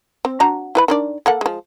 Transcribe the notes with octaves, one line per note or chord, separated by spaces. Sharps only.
C4
D4 F#4 A#5
E4 B4 B5
D#3 D4 D5
A#3 A4 F#5
F3 G#3